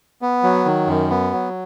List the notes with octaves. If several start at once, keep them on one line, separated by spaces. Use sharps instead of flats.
B3
F#3
D#3
F#2
B3
F#3